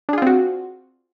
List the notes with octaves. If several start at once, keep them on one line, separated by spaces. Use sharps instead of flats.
C4 D4 F4 F#4 G#4